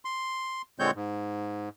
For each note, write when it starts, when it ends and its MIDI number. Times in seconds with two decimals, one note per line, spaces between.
0.05 0.62 84
0.79 0.91 46
0.79 0.91 50
0.79 0.91 56
0.79 0.91 60
0.79 0.91 73
0.79 0.91 91
0.95 1.69 44